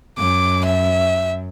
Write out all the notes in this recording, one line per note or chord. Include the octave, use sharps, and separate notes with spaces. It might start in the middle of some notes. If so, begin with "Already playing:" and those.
F#2 D6
E5